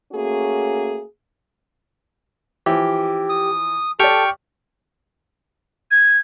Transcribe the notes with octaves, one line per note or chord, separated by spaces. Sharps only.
A3 A#3 C#4 F#4 G#4
E3 F3 G4
D#6
G4 A4 D5 G5 C#6 F6
G#6